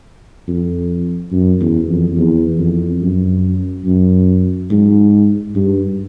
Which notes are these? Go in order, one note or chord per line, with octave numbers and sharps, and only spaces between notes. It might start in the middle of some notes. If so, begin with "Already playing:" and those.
F2
F#2
E2
F2
E2
F2
F#2
F#2
G#2
G2